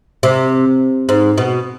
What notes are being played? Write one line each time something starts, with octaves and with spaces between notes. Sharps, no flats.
C3
G#2
B2